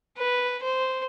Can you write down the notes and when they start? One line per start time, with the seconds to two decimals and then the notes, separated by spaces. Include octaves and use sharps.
0.17 B4
0.62 C5